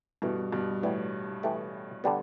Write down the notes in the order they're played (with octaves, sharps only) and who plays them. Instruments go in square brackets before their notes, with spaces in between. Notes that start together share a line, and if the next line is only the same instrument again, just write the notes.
[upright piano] G2 B2 [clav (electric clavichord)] E3 A3 E4 G4
[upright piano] G2 B2
[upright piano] A2 [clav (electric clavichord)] E3 G3 B3 D4
[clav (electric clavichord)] E3 A3 G4
D3 G3 B3